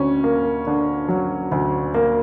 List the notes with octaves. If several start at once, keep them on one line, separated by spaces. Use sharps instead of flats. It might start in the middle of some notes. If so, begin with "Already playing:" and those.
Already playing: D2 C#4
A#3
D3
F#3
D2
A#3